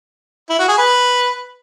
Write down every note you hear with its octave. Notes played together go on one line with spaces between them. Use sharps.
E4
F#4
G#4
B4